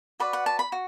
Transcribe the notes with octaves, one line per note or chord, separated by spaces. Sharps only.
F#4 B4 D5 B5
F#5
A5
B5
F#4